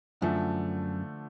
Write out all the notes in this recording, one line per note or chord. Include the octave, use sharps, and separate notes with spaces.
F#2 D3 F3 A3